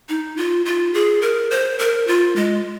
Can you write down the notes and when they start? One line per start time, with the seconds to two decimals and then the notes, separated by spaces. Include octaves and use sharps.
0.09 D#4
0.37 F4
0.65 F4
0.94 G#4
1.22 A#4
1.51 C5
1.79 A#4
2.07 F4
2.36 G#3